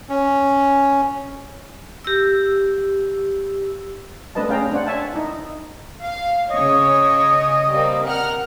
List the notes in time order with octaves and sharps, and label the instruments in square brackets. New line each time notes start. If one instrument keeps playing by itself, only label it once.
[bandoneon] C#4
[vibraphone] G4 E6
[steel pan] A3 C4 D4 B4 D#5 A5
C#4 G#4 F5 G5 A#5
D4 C5 F#5
C#5 E5 G#5 A5
D#4 E4
[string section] F5
[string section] C#3 C#5 [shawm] D#5
[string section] G3 A#3 C4
A#4 F#5 F6